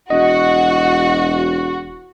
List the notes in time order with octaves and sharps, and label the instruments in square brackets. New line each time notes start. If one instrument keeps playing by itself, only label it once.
[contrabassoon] E1 [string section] F#4 [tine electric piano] D#5